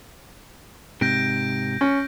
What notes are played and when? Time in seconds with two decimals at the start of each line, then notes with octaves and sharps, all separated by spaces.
1.01 G#2 C3 G6 A#6 D7
1.81 C#4